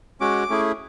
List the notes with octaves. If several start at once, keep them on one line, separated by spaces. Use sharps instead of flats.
G#3 C#4 F#4 D6
A3 C#4 E4 G#4